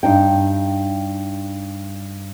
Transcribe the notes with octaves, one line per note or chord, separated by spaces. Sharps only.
G2 D#4 G5